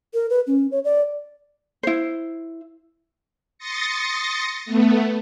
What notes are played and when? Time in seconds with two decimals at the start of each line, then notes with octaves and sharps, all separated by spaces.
0.14 A#4
0.30 B4
0.47 C#4
0.71 C#5
0.85 D5
1.83 E4 C5
3.58 C6 D#6 A6 A#6 C#7
4.66 A3 B3